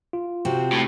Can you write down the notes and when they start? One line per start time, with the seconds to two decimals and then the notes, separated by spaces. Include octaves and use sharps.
0.13 F4
0.45 C3 C4 F#4
0.72 A2